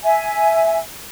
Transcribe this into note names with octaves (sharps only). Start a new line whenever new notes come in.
E5 G#5